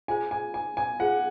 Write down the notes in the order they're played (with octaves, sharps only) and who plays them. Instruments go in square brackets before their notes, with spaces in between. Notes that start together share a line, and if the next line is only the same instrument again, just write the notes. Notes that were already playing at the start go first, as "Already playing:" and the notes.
[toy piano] F4 G#4 C5 [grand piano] G#5
[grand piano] G#5
G#5
G#5
[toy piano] F4 G#4 C5 [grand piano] F#5